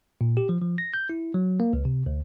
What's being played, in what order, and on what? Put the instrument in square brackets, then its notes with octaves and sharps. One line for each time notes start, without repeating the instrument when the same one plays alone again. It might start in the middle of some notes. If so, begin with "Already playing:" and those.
[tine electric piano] A#2
G4
F3
F3
A#6
G6
E4
F#3
A#3
C#2
C3
D2